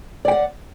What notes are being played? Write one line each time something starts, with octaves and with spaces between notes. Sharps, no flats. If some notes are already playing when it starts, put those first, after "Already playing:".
D5 F#5 G5